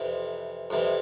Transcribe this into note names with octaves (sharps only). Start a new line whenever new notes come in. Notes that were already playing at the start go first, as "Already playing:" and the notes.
Already playing: F2 C3 E3
F2 C3 E3